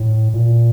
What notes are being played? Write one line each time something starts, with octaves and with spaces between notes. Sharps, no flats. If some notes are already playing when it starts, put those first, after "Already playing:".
Already playing: A2
A#2